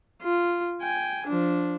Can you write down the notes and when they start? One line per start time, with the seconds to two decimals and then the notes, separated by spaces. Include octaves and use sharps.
0.22 F4
0.82 G5 G#5
1.27 F3 D4